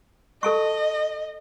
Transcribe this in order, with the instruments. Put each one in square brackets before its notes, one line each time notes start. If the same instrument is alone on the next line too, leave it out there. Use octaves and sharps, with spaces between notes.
[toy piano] A4 A5 C#6 [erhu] D#5